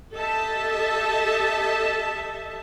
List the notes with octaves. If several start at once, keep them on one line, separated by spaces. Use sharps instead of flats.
G4 A4 D#5 E5 A5